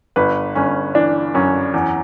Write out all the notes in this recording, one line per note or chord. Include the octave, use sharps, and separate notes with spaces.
G1 B4
G1 C#4
E3 D4
F#2 C#4
E2